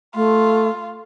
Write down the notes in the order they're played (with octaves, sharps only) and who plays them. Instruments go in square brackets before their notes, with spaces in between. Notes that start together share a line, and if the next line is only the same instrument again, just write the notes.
[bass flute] A3 [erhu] F4